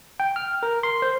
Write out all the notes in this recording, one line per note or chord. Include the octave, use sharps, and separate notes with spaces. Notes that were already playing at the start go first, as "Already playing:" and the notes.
G5
F6
A#4
C6
C5